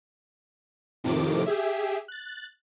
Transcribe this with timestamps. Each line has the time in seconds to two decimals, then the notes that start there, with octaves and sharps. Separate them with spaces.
1.04 F2 A2 C3 D#3 F3 D6
1.46 G4 G#4 E5
2.08 F#6 A6